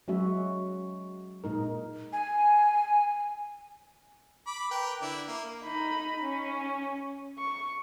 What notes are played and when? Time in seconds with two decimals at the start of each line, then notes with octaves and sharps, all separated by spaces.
0.08 F#3 G#3 C#4 F#4 E5
1.44 A#2 G#3 D#4 A#4
2.13 G#5
4.47 B5 D6
4.71 A#4 B4 G5
5.02 D3 E4 D5
5.28 A#3
5.64 D#4 B5
6.23 C#4
7.38 C#6